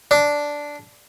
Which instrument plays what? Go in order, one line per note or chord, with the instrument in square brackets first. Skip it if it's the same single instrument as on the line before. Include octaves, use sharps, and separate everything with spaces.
[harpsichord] D4